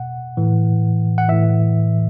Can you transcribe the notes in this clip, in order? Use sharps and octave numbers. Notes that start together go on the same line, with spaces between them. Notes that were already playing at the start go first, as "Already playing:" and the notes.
Already playing: B2 F#5
A2 E3
F#5
A2 E3 E5